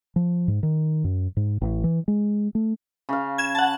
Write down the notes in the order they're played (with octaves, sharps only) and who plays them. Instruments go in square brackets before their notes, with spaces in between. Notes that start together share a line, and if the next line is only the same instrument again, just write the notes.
[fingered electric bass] F3
G#2
D#3
F#2
G#2
A1
E3
G#3
A3
[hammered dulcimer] C#3 F5
[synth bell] G#6 E7
F#5 A5